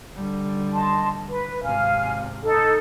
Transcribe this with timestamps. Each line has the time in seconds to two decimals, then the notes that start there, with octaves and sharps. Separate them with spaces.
0.15 D3 G3
0.74 D#5 A5 C6
1.28 B4
1.63 G#1 C3 F5 G#5 F6
2.43 D#4 A4